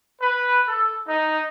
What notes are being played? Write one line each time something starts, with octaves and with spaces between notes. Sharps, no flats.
B4
A4
D#4